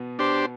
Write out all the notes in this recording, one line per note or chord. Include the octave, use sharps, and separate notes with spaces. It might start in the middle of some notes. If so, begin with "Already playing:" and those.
Already playing: B2 B3
D4 G4 C5